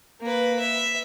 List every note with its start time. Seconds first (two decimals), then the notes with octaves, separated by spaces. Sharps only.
0.21 A#3 B4
0.59 E5